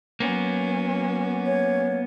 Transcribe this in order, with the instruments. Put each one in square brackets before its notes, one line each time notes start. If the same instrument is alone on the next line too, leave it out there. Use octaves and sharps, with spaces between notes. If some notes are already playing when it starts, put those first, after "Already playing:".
[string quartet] F#3 C#4 [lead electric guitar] A#3 B3
[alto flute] C#5